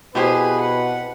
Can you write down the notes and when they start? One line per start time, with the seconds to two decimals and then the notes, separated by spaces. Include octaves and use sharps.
0.15 B2 C4 E4 G4 G#4 B4 C5
0.61 F#5